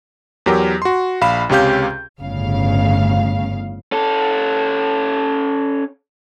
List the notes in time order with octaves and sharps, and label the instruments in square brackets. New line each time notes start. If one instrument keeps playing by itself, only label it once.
[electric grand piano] E2 F#3 G4 A#4
F#4 C6
A#1 F5 B5 E7
C#2 C3 C#4 G4 F5 G6
[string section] G1 A2 C#3 F5
[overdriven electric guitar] C#4 A4